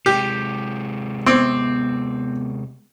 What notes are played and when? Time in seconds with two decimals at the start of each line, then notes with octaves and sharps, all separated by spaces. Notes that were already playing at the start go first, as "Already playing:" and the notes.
0.06 C3 G#3 G4
1.26 B3 C4 D6 D#6